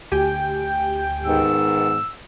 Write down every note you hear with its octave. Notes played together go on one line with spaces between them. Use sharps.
D2 G4 G5 G#5
G#2 D#3 B3 E6